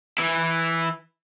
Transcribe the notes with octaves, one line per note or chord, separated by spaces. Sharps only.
E3 E4